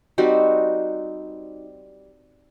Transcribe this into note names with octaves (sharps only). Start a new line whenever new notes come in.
G3 C4 D#4 F#4